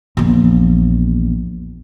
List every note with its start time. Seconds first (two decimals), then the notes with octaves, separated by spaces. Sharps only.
0.17 A#1 E2